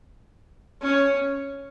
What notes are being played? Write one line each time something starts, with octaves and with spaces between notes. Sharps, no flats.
C#4